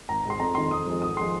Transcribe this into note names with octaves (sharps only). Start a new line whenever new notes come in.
G#1 A#5
G#2 G#3 C6
F2 A#5
D#3 G#3 C6
F2 D#6
F3 G#3
G#1 D#6
F3 G#3 C6